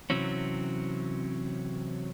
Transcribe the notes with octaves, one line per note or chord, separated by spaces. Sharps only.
C3 E3 F#3 C4 C#4